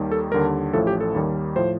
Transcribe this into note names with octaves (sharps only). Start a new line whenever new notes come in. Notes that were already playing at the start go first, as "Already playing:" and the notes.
Already playing: D#2 D#3 G3
A4
D#2 D3 G3 A#4
A1 A2 F3 A4
G4
A4
D#2 D#3 G3
A2 F3 C5